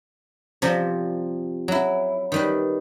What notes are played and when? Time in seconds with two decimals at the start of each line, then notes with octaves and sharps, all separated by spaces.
0.62 C3 F3 G3 C4
1.68 F#3 E4
2.32 D#3 G3 B4